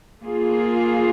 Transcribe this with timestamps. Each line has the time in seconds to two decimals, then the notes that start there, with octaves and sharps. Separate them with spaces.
0.23 A#3 F4 G#4